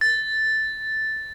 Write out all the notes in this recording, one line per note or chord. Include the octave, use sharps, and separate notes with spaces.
A6